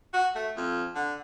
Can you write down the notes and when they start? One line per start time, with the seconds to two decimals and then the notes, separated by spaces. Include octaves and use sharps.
0.13 F#4
0.35 A3
0.56 F2
0.95 D3